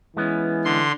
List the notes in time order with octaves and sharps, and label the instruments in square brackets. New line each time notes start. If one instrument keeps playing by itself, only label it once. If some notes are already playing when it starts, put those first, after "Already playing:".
[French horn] E3 [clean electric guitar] G#3 B3 C#4
[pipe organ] D3 C6